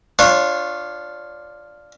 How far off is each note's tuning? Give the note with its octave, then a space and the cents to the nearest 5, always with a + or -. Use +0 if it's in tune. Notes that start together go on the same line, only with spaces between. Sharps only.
D4 +0 F4 +0 C#5 -20